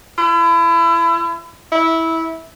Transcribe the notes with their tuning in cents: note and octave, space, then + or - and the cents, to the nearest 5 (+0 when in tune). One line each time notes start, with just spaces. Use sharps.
E4 +30
E4 -15